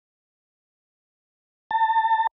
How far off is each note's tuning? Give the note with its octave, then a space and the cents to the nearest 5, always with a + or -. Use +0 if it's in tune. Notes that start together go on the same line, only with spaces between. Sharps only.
A5 +30